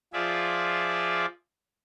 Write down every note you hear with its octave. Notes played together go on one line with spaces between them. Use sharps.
F3 F4 G#4 D5 E5